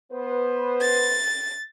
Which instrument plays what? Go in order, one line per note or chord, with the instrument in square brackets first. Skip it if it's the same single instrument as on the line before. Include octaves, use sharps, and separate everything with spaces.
[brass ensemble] B3 B4 C5
[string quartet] A6